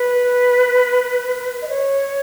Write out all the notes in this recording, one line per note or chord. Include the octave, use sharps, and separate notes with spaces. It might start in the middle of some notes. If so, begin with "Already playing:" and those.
Already playing: B4
D#5
C#5